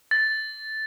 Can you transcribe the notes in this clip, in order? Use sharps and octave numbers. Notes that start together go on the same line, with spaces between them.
A6